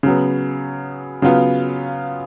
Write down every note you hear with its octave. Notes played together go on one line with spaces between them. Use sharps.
C#3 F#3 B3
C#3 F#3 B3 F4